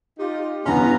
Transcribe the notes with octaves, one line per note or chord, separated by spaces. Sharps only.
D#4 F4 G4
E2 G2 B3 C#4 A#5 C6